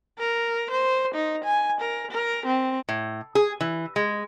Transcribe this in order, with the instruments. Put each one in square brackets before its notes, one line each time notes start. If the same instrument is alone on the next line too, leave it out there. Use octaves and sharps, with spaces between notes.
[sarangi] A#4
C5
D#4
G#5
A#4
A#4
C4
[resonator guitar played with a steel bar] A2
G#4
E3
G#3